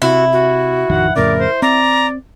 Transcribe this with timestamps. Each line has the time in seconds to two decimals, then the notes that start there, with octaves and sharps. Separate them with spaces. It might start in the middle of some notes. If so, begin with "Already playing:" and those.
0.02 C3 E4 F#4
0.32 F#4
0.90 A1 F2 D#3 F#5
1.16 F2 A2 C#3 A#4 D5
1.39 C5
1.62 C4 D5 A#5